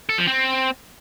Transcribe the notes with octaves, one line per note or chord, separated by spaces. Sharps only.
A4
F3
C4